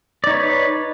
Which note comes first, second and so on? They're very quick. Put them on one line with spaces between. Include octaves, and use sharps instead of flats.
D5 D#4 C#5 B4